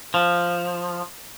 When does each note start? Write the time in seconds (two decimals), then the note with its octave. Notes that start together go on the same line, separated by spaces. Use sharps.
0.14 F3